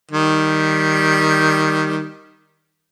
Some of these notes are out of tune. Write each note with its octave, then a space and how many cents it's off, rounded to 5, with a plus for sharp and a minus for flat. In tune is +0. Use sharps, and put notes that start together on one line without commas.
D#3 +0 G3 -5